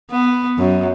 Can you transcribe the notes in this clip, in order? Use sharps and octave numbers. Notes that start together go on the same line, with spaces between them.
B3
F#2